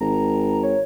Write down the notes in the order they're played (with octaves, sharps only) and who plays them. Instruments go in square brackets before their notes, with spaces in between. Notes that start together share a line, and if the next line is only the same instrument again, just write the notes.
[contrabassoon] G#1 [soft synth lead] A#5
[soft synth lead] C#5